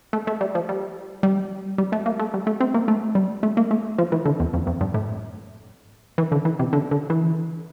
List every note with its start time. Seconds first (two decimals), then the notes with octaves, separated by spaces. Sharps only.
0.13 A3
0.27 A3
0.41 G3
0.55 F3
0.69 G3
1.23 G3
1.78 G3
1.92 A3
2.06 A#3
2.19 A3
2.34 G3
2.47 A3
2.60 C4
2.74 A#3
2.88 A3
3.15 G3
3.43 A3
3.57 A#3
3.71 A3
3.98 F3
4.12 E3
4.25 D3
4.40 E2
4.54 F2
4.67 F2
4.81 G2
4.94 A2
6.18 E3
6.32 D3
6.45 E3
6.59 C3
6.73 D3
6.91 D3
7.10 E3